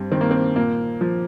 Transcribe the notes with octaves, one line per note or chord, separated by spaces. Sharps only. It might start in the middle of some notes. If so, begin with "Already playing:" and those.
Already playing: G2 C4
D#3 C4
A#3
C4
A#2 A#3
F3